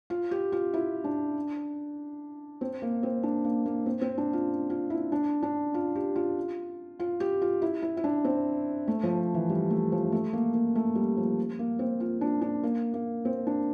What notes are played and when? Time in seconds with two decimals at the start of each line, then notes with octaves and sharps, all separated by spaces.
0.10 F4
0.31 G4
0.52 F4
0.74 E4
1.04 D4
2.61 C4
2.82 A#3
3.03 C4
3.23 D4
3.44 A#3
3.66 A#3
3.86 C4
4.01 C4
4.18 D4
4.33 F4
4.70 F4
4.90 E4
5.12 D4
5.43 D4
5.74 F4
5.95 G4
6.16 F4
7.00 F4
7.20 G4
7.42 F4
7.62 E4
7.82 E4
7.97 E4
8.04 D4
8.25 C4
8.88 A3
9.03 F3
9.34 E3
9.49 G3
9.70 A3
9.92 F3
10.12 A3
10.33 A#3
10.54 A#3
10.75 A3
10.95 G3
11.17 F3
11.59 A#3
11.79 C4
12.00 F4
12.21 D4
12.41 D4
12.63 A#3
12.94 A#3
13.25 C4
13.47 D4